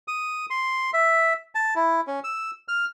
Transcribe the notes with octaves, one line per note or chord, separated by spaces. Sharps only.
D#6
C6
E5
A5
E4
C#4
E6
F6